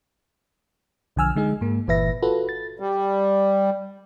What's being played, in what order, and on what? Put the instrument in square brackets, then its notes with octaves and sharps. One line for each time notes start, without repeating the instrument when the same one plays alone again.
[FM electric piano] B1 D3 F3 G#5 E6 F6
D3 G#3 D#4 G#4
G#2 A#3
G1 A#2 E3 B4 E5 A#6
F4 F#4 A4 B4
A6
[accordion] G3